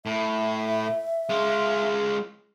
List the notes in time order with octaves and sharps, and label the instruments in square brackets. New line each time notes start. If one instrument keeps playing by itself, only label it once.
[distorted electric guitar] A2 [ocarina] E5
[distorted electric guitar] G#3 F4